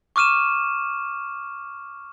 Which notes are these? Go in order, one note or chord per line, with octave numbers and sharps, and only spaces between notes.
C#6 D6 F6 D#7 E7